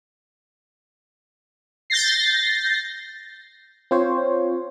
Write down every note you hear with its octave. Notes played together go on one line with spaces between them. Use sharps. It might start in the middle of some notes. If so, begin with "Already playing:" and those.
G6 A6 A#6 C7
C4 F4 C5 C#5